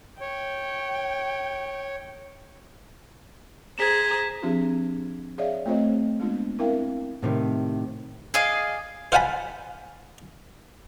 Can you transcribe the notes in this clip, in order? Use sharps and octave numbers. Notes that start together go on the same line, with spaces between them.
C#5 G5
G#4 C5 A#5 G#6 B6 E7
F3 C4 D4 F4 G4 G#4
G#4 C#5 D5 E5 F5
A3 C4 F4 C5 C#5 D#5
G#3 B3 D4 F4
C4 E4 A#4 E5 F5 G5
A2 C3 D#3
G#4 D5 D#5 F5
C5 F5 F#5 G#5 A5 B5